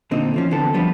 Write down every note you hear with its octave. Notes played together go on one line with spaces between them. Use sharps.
D2 A#2 D3 C4 D#4
E3 F3 C#4
E2 D3 B3 C4 A4
F3 G3 B3 D4